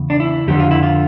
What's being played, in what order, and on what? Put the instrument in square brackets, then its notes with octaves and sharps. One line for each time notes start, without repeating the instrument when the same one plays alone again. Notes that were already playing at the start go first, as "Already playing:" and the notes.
Already playing: [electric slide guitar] E2 C#3
D4
E4
F2 D3 F3 G4
F4
E4
F4